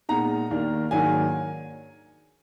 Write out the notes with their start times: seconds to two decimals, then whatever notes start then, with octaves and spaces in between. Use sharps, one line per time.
0.09 A#2 G#3 B3 D#4 A#5
0.50 D#2 D#3 A#3 D4
0.91 G#2 D#3 F#3 A#3 D4 G#5